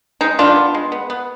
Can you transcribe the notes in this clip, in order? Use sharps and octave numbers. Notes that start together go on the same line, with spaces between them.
G#3 D#4
D#3 D4 F4
B3
G#3
B3
B3